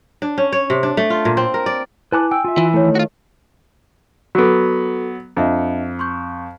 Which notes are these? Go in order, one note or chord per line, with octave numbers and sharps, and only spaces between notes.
D4
C#4
C#5
C3
D4
A3
F4
A#2
C4
A#4
D5
E4 B4 G#5 A5 D6 F#6
G5 G#5 E6
F4 E5
E3
D#3 A3 E4 C#5
F4 F#4
F#3 B3 F#4 A4
F2 D4 D#5 E5
C6 C#6 G6